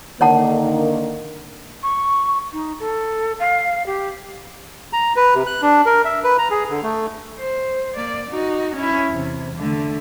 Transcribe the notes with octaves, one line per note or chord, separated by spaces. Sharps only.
D3 D#3 A#3 C#5 F#5 A5
C#6
D#4
A4
F5
G4
A#5
B4
C3
F#6
D4
A#4
E5
B4
A#5
G#4
D3
A3
C5
A#3 D5
D#4 F#4
C#4 E4
E2 C3
D3 A3